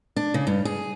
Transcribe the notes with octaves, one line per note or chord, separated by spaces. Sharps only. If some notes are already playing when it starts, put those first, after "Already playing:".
D4
C#3
G2
G#4